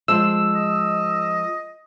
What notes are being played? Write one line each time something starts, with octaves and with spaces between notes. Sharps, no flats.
F3 G#3 E6
D#5